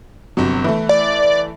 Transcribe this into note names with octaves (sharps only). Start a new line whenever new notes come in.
G1 C3 F#3
E3 A3
D5